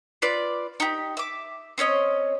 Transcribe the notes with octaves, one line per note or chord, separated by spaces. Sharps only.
F4 B4 D5
D#4 G4
E5 D6
C4 C#4 C#5 D#5